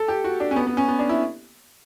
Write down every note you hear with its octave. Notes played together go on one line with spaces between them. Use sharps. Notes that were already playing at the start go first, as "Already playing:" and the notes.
Already playing: A4
G4
F#4
D4
C#4
B3
B3
C#4
B3
D4
E4